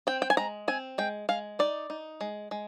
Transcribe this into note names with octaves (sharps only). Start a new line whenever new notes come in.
C4 G5
G5
G#5
G#3 A#5
C4 G#5
G#3 G5
G#3 F5
D#4 D5
D#4
G#3
G#3